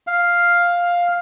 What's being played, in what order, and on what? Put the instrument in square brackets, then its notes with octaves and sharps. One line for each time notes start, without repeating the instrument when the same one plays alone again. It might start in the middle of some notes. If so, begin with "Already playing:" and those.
[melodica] F5